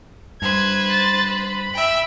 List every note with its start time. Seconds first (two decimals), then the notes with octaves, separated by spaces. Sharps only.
0.42 G2 B4 C5 G#6
0.91 A6
1.31 B5
1.73 E5 G5